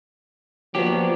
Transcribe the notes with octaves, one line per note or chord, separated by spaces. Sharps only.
F3 F#3 A#3 B3 D4 G4